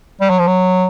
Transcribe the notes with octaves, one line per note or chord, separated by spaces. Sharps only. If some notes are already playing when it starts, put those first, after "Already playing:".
G3
F#3
F3
F#3